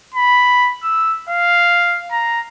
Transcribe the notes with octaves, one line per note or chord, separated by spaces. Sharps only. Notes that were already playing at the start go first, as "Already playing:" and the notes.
B5
E6
F5
A#5